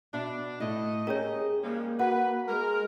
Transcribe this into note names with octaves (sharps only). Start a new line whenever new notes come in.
B2 D4 E5
A2 A3 E4 D#5
C#4 G4 G#4 A#4 C#5 A#5
F3 G3 G#3 A#3
F#4 B4 F#5
G#3 A#4